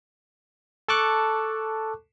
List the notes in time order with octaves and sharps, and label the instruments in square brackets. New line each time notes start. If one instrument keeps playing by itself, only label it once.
[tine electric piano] A4 A5 C#6 D6 F#6